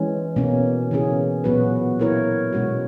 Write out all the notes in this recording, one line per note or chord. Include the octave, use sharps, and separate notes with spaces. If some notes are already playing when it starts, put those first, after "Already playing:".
Already playing: E3 G#3 C#4
B2 A#3 C#4
C#3 E3 A#3 C#4 G#4
A#2 F#3 B3 F#4 B4
A#3 E4 A#4 C#5
B2 G#3 C#4 F#4